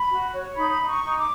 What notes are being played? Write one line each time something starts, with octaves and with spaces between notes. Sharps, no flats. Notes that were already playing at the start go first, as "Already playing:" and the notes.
Already playing: B5
F#4
C#5
D#4 B5
D#4
C#6
D#4
D6